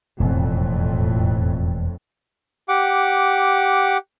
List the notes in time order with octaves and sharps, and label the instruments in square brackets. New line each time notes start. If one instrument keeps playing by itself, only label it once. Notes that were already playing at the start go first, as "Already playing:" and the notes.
[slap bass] E1 [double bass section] F2 A2
[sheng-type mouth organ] G4 F#5 D6